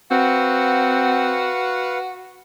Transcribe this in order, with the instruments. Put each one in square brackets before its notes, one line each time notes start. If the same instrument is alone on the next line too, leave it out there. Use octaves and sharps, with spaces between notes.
[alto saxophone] C4 [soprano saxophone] F#4 [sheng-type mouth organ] B4 F5 F#5